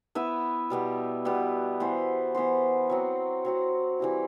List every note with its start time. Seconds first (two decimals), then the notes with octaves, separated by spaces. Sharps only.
0.15 B3 E4 B4 E5
0.70 B2 G3 B3
1.25 B2 G3 B3
1.80 E3 B3 F#4 C5
2.35 E3 B3 F#4 C5
2.90 F#3 C4 F#4
3.45 F#3 C4 F#4
3.99 E3 G3 C4 E4